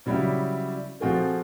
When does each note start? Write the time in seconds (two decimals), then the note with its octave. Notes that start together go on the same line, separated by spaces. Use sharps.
0.06 C#3 F#3 G3 D4 E4 G4
1.00 F3 C4 F4 F#4 G#4 A4